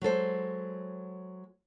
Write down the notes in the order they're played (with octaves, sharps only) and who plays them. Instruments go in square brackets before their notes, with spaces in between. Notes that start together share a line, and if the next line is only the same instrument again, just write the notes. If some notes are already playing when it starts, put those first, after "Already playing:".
[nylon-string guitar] F#3 G#3 A4 C5